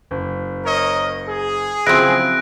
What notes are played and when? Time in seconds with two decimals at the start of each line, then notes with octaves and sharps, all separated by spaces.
0.11 F#1
0.65 A#4 C#5 D#5
1.28 G#4
1.87 C#3 F3 F#3 C4 E4 F#6 A#6 D7